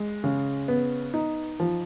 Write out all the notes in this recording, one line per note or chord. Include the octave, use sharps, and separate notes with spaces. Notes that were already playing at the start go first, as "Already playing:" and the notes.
Already playing: G#3
C#3
B3
D#4
F3